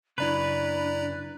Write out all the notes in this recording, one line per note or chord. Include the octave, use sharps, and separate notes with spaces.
F#2 C#3 D4 E4 B4 D5 A#5